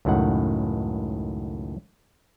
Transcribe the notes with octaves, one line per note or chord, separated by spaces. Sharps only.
C#2 F#2 A2 D#3 F#5